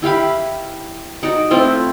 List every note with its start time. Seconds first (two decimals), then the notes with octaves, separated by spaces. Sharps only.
0.02 E4 G4 F5 B5
1.23 D#4 F#4 C#5 D5
1.50 A3 C4 E4 F4